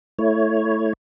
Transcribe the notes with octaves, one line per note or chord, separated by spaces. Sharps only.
A3 E4 C#5